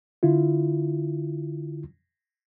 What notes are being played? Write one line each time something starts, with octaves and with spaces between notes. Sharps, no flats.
D3 E4 F4